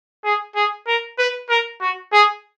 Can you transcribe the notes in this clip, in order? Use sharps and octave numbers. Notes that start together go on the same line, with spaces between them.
G#4
G#4
A#4
B4
A#4
F#4
G#4